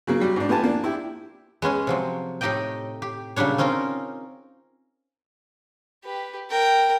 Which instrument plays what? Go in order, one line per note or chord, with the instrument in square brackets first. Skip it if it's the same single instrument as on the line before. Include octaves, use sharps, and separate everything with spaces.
[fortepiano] C#3 F#3 A#3
F#3 G3
G#2 D4
A3 B3 F4 G4 G#5 A5
F3 A#3 D4
E4 G4
[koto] G#3 B3 C#4 G#4
C3 F3 F#3
A2 A3 D#4 G4 D#5 G5
G4
A#2 C#3 F#3 G3 D4 C#5
C4 C#4 D#4 F4 A#4
[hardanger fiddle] G4 B4
A#4 G5